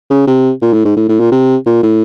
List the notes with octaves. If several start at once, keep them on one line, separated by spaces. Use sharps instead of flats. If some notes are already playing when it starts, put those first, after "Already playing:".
C#3
C3
A#2
A2
G#2
A2
A2
A#2
C3
A#2
A2